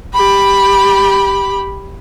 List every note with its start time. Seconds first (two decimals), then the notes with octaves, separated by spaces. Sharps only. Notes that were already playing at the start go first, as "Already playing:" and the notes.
0.13 G4 B5